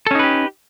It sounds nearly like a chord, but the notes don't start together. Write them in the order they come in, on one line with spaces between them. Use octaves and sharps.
A4 C#4 D#4 B4 G4